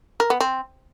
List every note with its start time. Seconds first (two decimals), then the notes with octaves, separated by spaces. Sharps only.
0.20 A#4
0.30 B3
0.40 C4